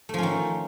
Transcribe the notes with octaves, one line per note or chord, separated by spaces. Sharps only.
D#3 F3 A3 C#4